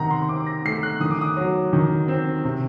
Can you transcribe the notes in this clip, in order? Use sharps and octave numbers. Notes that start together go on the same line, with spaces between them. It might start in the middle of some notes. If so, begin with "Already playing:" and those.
Already playing: C3 D#3 F#5 A#5
C6
C6
C4 D6
A#6
A3 C7
F#6
D#3 D#6
D6
D#6
F#3
D#3
C4
C3